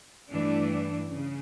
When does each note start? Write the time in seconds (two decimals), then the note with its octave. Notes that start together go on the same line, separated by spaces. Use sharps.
0.30 G2 E3 A3 D4
1.11 C#3